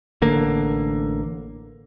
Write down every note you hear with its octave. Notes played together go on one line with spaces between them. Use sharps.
A1 D3 A#3